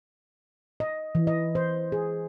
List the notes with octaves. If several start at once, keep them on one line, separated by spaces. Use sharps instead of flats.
D#5
E3
D#5
C5
G#4